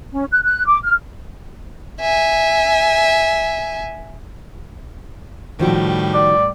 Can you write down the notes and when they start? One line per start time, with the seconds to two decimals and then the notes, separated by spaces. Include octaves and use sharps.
0.12 C#4
0.32 F#6
0.43 F#6
0.66 D6
0.84 F6
2.01 E5 G#5
5.59 A2 D#3 F3 G3 F#4
6.14 D5